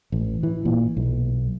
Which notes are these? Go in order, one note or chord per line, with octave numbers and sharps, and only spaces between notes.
A1
E3
A#2
B1